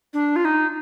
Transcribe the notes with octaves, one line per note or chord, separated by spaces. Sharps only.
D4
F4
D#4